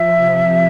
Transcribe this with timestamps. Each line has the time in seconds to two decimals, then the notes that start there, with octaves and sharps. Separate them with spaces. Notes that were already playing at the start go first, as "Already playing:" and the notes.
Already playing: F3 E5
0.16 C3